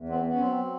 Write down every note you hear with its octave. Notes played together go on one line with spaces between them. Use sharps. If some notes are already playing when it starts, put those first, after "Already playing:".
Already playing: E2
B3 C4
B3
C#4
F#3 C4
F#3